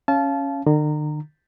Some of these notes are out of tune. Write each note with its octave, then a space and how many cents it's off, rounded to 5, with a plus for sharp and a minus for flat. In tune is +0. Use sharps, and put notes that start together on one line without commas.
C#4 +0 F5 -20 A5 -25
D3 +45 A#5 -15